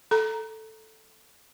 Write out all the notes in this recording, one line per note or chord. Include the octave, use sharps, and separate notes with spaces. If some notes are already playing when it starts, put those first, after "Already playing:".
A4 A#5